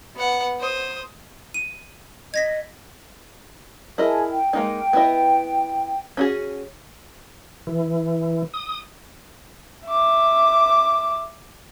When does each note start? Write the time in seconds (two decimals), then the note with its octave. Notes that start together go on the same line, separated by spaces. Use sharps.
0.16 B3 F#5
0.60 C5 D#6
1.54 D#7
2.34 D#5 G#6 A#6 B6
3.98 E4 G#4 A#4 D#5 A5
4.28 G5
4.53 G#3 A#3 D#4
4.93 B3 E4 D#5
6.17 C#4 F#4 G#4
7.67 E3
8.53 D#6
9.87 E5 D6